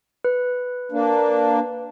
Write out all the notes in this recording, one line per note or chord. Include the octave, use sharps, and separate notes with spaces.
B4
A#3 D4